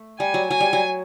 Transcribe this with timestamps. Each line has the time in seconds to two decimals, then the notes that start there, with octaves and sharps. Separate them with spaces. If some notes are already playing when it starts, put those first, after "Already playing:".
Already playing: A3
0.20 G3 G#5
0.34 F#3
0.50 F#3 G#5
0.61 G3
0.73 F#3